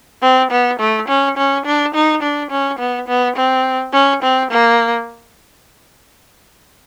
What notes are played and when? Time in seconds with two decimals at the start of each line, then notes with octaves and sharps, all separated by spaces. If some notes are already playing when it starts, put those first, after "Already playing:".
0.22 C4
0.51 B3
0.79 A3
1.08 C#4
1.37 C#4
1.65 D4
1.94 D#4
2.22 D4
2.51 C#4
2.79 B3
3.08 B3
3.36 C4
3.93 C#4
4.23 C4
4.51 A#3